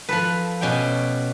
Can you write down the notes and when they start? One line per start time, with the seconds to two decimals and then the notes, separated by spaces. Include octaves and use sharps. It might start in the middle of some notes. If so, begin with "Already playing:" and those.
0.09 F3 A4 B4
0.61 B2 C#4 G4 G5